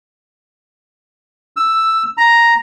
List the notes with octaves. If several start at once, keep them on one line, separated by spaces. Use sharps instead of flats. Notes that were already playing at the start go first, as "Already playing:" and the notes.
E6
A#5